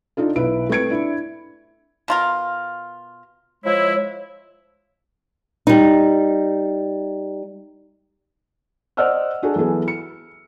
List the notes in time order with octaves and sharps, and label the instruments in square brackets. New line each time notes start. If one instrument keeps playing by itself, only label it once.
[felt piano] D4 D#4 F4 A4
B1 E4 B4 D7
A3 C4 B4 G#6 C#7 D7
D4 E4
[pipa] B2 F4 A#4
[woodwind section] F3 G#3 E4 [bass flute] C#5
[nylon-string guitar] G3 D#4
[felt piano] C5 D5 D#5 F#5 E6 F6
D4 F#4 G#4 A4
E3 F#3 B3 G#4 A4
C#7